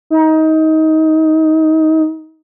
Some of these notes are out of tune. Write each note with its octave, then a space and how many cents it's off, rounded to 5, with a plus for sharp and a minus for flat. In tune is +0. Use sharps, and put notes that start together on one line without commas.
D#4 +25